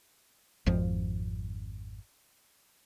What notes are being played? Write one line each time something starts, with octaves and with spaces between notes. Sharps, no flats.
G#1 F2 F3